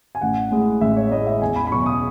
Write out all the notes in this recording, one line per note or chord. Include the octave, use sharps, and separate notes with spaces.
G#5
A1 F#5
A2 G#3
A1 E5
C#5
A2 G#3 D#5
E5
E2 G#5
B5
B5
B2 F#3 C#6
D#6